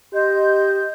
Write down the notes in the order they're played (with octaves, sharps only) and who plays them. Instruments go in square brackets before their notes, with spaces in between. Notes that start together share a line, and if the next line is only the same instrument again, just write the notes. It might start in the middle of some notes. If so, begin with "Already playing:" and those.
[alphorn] G4 [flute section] D#5 C6 G6